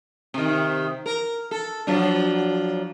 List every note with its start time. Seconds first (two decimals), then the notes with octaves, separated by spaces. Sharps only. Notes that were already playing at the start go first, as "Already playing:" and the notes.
0.34 C3 D#3
1.06 A#4
1.51 A4
1.87 F3 F#3 D4